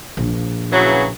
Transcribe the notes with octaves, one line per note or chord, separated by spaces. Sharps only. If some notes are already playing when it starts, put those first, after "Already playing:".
A#1
C#3 E3 F#3